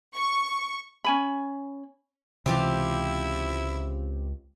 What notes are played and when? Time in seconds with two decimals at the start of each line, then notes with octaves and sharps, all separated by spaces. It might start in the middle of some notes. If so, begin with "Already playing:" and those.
0.14 C#6
1.04 C#4 G#5 B5
2.46 C#2 C3 E3 C4 E4 F4 G4